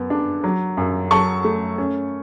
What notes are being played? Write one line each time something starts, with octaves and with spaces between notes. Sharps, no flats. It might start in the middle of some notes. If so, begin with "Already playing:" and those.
Already playing: F#2 B3
D4
F#3
F#2
F#3 A5 C#6
A3
C#4